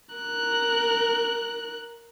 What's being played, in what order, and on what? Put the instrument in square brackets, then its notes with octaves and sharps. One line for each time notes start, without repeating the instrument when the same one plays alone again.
[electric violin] A#4 F#6